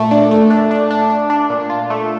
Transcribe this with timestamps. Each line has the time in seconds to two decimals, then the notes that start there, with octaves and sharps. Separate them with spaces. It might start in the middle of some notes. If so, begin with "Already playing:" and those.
Already playing: A#2 A3
0.11 D4
0.31 A3
0.50 D4
0.71 D4
0.91 D4
1.10 D4
1.30 D4
1.50 A#2
1.70 F4
1.90 A3